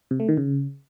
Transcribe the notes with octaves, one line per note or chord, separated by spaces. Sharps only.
C3
A3
D#3
C#3